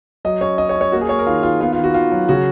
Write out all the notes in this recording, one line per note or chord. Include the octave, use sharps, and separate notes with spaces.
F#3 D#5
C#4 C#5
C#4 D#5
C#5
C#4
C#5
A#3 F#4
G#4
A#3 C#5
A#4
D#3 F4
D#3 F4
B3 F4
F4
D#3
F#4
D#3 F4
F#3
C#3 F#4